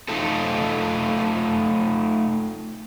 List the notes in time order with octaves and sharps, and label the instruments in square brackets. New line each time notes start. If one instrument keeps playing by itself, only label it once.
[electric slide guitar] A3 D#4 F4 A4